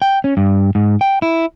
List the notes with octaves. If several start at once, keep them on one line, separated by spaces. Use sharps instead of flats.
G5
C#4
G2
G#2
G5
E4